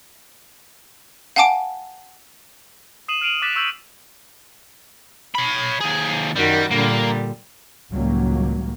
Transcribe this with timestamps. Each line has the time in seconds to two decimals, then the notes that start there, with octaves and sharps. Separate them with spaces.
1.36 F5 F#5 G#5 A5 D6 D7
3.08 D#6 C7 D#7 E7 F#7
3.21 F6 C7 D7 D#7 F7 F#7
3.42 D6 D#6 F#6 A6 B6 E7
3.56 C#6 E6 G6 F#7
5.35 C#5 B5
5.80 D#2 G#4
6.36 F#2 D#3 G3 F#4
6.71 A#2 D3 G3 A#3
7.90 C#2 A2 D#3 F#3 G3 A#3